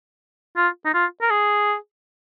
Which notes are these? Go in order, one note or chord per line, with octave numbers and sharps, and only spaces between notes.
F4
D#4
F4
A#4
G#4